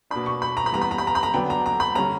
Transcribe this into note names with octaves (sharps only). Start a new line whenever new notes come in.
B2 A#3 D4 B5
C#6
B5
A#5
B5
E3 G3 B3 A#5
B5
A#5
B5
A#5
B5
A#5
D3 F#3 B3 D4 G5
A#5
A#5
B5
D3 G3 C#4 A#5